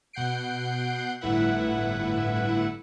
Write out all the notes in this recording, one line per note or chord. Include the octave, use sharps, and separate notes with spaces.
B2 F#5 G6 C7 D7
G1 A2 E4 B4 E5 F#5